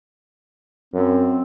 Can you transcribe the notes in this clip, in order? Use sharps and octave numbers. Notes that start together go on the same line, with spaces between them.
F#2 C4